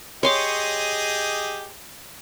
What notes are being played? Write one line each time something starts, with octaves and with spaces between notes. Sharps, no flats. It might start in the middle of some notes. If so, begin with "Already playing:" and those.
G4 G#4 C#5 D#5 C6 D6